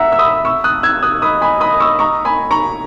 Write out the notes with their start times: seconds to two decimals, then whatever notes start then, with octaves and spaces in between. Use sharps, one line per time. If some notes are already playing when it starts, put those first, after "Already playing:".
Already playing: E5 F#5 A#5
0.12 E6
0.19 B5 D#6
0.45 C#6 E6
0.64 D#6 F#6
0.83 E6 G#6
1.03 D#6 F#6
1.22 D#5 B5 D#6
1.41 G#5 B5
1.61 B5 D#6
1.80 C#6 E6
1.99 A#5 C#6
2.25 G#5 B5
2.51 A#5 C#6